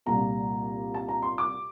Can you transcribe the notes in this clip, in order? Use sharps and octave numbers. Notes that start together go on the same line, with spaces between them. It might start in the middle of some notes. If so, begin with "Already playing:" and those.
C2 A#2 G3 A#5
A5
A#5
C6
D6